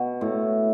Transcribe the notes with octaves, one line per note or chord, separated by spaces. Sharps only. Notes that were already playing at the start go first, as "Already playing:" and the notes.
Already playing: B2
A2